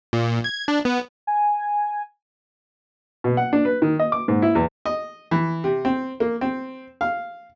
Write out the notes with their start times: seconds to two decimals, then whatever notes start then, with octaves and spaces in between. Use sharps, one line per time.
0.13 A#2
0.44 G#6
0.68 D4
0.85 B3
1.27 G#5
3.24 B2
3.37 F#5
3.53 D4
3.65 B4
3.82 D#3
3.99 D#5
4.12 D6
4.28 G#2
4.42 E4
4.55 E2
4.86 D#5
5.31 E3
5.64 C3
5.85 C4
6.20 A#3
6.41 C4
7.01 F5